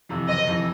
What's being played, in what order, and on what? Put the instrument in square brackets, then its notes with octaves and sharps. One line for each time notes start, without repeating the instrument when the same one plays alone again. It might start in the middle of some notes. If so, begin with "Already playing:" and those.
[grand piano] F2 C3 E3
[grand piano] F#1 [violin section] D#5
[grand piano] F2 C3 E3